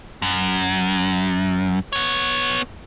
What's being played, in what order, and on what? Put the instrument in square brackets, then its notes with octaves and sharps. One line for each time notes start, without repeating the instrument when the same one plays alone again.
[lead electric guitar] F#2
B3 C#5